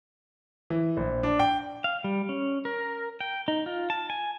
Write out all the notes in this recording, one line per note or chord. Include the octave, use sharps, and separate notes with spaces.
E3
A#1
D4
G5
F5
G3
C#4
A#4
G5
D#4
F4
A5
G#5